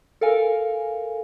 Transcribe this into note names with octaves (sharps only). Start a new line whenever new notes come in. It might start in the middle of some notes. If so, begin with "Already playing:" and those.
A4 A#4 F5 G#5